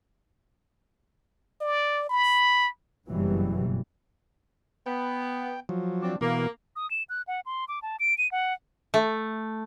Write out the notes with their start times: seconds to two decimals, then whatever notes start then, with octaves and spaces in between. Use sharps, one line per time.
1.61 D5
2.09 B5
3.09 F#1 G2 B2 E3 F#3 G3
4.86 B3 G5
5.69 F3 F#3
6.02 C4 D4
6.21 B2 E3 A#3
6.76 D#6
6.91 E7
7.09 F#6
7.28 F#5
7.46 C6
7.68 D6
7.82 A5
8.00 D7
8.18 D#7
8.32 F#5
8.94 A3